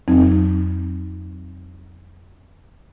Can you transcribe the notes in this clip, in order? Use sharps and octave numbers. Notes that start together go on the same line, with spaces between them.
F2 F#3 C4 D#4